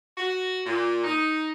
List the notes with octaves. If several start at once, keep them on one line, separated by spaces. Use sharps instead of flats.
F#4
A#2
D#4